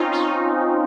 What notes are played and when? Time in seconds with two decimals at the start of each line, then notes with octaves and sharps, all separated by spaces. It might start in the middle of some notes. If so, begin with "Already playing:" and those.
Already playing: C4 C#4 D#4 F4
0.12 D#4